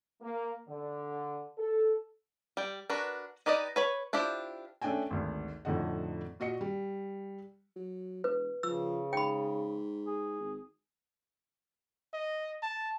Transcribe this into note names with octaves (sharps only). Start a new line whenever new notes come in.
A#3
D3
A4
G3 G5
D4 F#4 A#4 B4
D#4 G4 B4 D5 D#5
B4 C#5 B5
D4 E4 F4 G4 C5
A3 C#4 D4 D5 G5 G#5
G#1 D2
F2 A2 D3 D#4 F#5
A#2 F#4 D#5 C#7
G3
F#3
E1 B4
C#3 F3 E6
G#2 G5 B5
G#4
G#1
D#5
A5